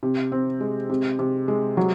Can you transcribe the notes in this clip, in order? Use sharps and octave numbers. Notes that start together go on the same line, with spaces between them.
C3
C4
G#3
C3
C3
G#3
F#3